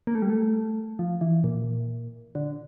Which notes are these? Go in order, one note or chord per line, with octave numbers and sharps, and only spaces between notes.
A#3
A3
G3
A3
F3
E3
A#2
D3